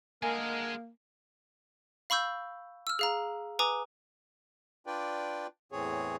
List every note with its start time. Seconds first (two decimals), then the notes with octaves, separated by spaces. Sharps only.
0.23 D3 D#3 A#3 G#4 A#4 D#5 G#5
2.10 F5 B5 C#6 E6 G6
2.87 E6 F6
2.99 G#4 F5 A#5
3.59 B4 G#5 A#5 D6 D#6
4.87 D4 F4 B4 D5 G5
5.72 E2 A2 E3 C4 G#4 C#5